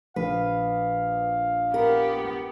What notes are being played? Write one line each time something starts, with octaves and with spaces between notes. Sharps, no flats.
A#1 B4 F5
B3 G4 A#4